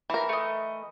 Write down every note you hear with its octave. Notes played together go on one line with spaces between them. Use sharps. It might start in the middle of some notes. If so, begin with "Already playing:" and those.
E3 A#4
A3 D#5